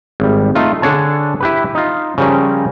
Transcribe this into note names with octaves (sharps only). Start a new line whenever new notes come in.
G#1 G3
A3 D#4 F4
D3 D4 G#4 C#5 A5
E4 G4 B4
D#4 F4
C#3 F3 G3 C#4 A#4